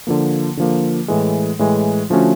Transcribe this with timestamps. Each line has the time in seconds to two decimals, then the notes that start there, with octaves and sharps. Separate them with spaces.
0.07 D3 F3 A#3
0.57 D3 F3 A#3
1.08 A2 E3 G#3
1.59 A2 E3 G#3
2.10 D3 F3 A3 C#4 F#4